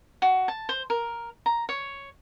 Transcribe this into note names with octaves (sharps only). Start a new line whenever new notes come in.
F#4
A5
C5
A#4
A#5
C#5